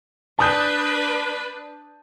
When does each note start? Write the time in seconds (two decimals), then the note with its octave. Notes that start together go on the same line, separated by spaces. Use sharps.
0.39 D4 B4 A5 D#6 G6